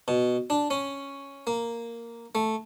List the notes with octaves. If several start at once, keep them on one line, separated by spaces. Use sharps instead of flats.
B2
D4
C#4
A#3
A3